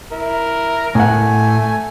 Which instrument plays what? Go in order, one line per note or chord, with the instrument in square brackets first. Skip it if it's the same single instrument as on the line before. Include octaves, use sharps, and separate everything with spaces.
[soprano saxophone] E4 [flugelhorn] A#4
[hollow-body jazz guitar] A2 F#5 [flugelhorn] A3 [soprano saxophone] G#5